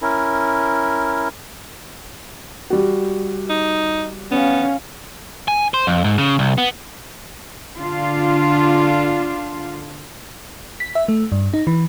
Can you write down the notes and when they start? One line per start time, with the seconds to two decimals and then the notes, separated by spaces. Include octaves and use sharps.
0.02 C#4 E4 A#4
2.70 G3 F#4
3.49 D#4
4.31 B3 C#4 F5
5.48 G#5
5.74 C5
5.87 F2
6.04 G#2
6.18 C#3
6.39 C2
6.58 B3
7.76 D3 D4 F4
10.80 B6
10.95 E5
11.08 A3
11.32 G2
11.54 D#4
11.67 E3